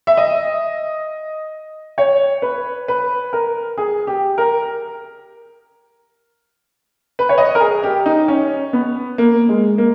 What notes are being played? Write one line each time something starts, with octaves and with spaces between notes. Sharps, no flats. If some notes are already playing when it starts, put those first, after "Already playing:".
E5
D#5
C#5
B4
B4
A#4
G#4
G4
A#4
B4
C#5
D#5
A#4
G#4
G4
D#4
C#4
B3
A#3
G#3
A#3